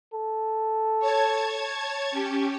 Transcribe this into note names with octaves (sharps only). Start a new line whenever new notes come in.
A4
C#5 A5 G#6
C#4 G4